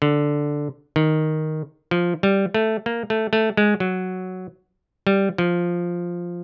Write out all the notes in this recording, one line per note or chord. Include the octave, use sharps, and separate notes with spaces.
D3
D#3
F3
G3
A3
A#3
A3
A3
G#3
F#3
G3
F3